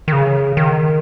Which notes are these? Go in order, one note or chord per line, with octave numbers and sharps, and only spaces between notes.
D#3
C#3
D#3